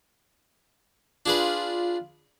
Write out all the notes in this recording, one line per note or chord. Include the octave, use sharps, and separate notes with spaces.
D4 F4 G#4 B4